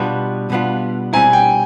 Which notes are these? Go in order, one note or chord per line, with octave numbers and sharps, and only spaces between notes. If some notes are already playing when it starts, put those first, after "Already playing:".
Already playing: B2 G3 B3 D4 F4
B2 G3 B3 D4 F4
B2 G3 C4 E4 G#5
G5